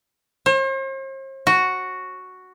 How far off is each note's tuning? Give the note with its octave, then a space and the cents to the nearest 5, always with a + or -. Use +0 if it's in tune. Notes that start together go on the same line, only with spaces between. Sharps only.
C5 +45
F#4 +0